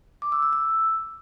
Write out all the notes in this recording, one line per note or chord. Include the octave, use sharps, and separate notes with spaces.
D6
E6
E6
E6